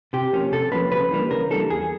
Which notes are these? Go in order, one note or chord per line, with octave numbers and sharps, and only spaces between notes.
C3 G4
F3 A#3 C#4
C3 A4
F3 A#3 C#4 B4
C#3 B4
E3 G3 A#3 D4
C#3 A#4
E3 G3 A#3 D4 A4
E2 G#4